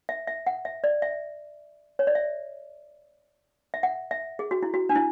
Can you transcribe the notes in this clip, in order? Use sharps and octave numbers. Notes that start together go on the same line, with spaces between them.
E5
E5
F#5
E5
D5
E5
C#5
D5
E5
E5
F#5
E5
G#4
F#4
E4
F#4
D4
E4